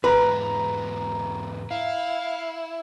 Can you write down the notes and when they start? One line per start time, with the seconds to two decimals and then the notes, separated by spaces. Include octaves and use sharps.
0.04 E2 G#2 B3 B4 A#5 B5
1.71 E4 F5